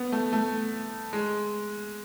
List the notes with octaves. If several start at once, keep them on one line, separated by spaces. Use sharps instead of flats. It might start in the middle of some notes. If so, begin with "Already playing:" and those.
Already playing: B3
A3
A3
G#3